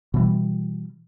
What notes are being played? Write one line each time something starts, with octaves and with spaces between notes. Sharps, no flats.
B2 E3 G3